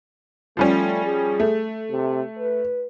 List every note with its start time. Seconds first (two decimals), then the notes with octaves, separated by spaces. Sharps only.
0.57 F3 G3 A3 C#4
1.05 G#4
1.40 A3
1.90 C3
2.39 B4